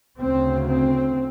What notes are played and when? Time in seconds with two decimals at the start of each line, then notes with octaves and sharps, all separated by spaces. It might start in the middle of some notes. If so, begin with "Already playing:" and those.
0.19 D2 C#3 C4
0.69 C4